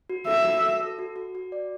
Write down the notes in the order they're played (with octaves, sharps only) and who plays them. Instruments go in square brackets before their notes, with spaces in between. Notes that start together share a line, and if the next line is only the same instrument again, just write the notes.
[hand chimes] F#4
[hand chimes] A4 [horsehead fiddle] E5
[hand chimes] F#4
A4
A4
F#4
F#4
F#4
D5